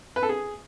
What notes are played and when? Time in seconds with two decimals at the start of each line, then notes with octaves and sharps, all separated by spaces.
0.16 B4
0.23 A4
0.29 G#4